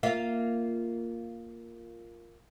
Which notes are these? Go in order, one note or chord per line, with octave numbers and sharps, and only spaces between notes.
A#3 F4 E5